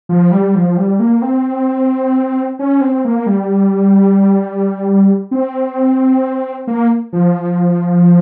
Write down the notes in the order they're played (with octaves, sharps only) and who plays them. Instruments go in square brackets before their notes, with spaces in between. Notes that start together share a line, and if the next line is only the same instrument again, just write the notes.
[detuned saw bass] F3
G3
F3
G3
A#3
C4
C#4
C4
A#3
G3
C4
A#3
F3